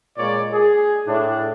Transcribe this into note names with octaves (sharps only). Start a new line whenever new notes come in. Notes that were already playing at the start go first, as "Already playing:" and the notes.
A#2 G#3 C#5 D5
G#4
A2 D4